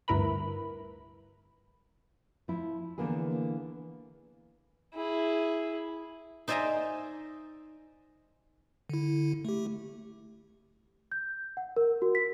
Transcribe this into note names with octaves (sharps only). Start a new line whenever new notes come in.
D2 G2 E4 A#4 B4 B5
F3 E4
D3 E3 A#3 B3 G#4
E4 G#4
D#4 C5 D5 E5 G#5 A#5
D3 E4
A3 G4
G6
F#5
A#4
F#4
B6